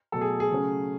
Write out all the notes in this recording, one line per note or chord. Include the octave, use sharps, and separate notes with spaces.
B2 F#3 A3 A4
G#4
G#4
C#3 F#3 A3 C#4